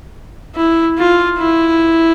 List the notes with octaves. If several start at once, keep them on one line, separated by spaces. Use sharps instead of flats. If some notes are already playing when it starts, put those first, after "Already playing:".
E4
F4
E4